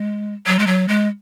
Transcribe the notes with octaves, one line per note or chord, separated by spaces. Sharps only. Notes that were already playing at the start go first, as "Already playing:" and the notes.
Already playing: G#3
F#3
G#3
F#3
G#3